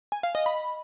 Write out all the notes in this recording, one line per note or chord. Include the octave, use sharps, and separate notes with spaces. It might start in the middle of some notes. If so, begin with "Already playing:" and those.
G#5
F5
D#5
B5